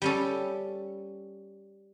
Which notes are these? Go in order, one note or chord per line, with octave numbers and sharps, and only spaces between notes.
G3 C#4 A4